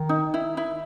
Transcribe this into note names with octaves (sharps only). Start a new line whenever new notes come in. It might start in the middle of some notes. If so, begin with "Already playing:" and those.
Already playing: D#3
D#4
E4
E4